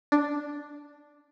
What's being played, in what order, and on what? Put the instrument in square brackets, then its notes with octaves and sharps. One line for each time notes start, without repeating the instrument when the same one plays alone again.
[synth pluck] D4